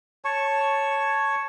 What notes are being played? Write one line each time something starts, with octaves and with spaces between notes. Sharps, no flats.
C#5 A5 C#6